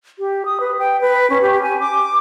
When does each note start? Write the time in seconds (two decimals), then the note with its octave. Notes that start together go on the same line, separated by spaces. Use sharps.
0.19 G4
0.45 D#6
0.60 B4
0.79 G5
1.01 B4
1.30 C#4
1.41 G4
1.63 G#5
1.80 D6